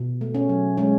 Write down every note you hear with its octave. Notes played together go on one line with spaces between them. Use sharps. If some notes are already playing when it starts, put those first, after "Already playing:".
Already playing: B2
A3
C#4
F#3
G#3 C#4